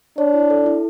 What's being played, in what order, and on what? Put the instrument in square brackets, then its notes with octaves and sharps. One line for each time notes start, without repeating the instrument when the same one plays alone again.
[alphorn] D4 [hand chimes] C#5
[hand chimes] E4
A4
E4